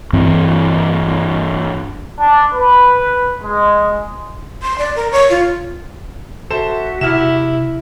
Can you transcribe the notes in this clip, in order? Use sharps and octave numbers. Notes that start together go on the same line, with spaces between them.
G2 E3 C4
D4
B4
G#3
C6
D5
A#4
C#5
F4
F#4 A4 C5 E5 E7
C3 E4 F6 E7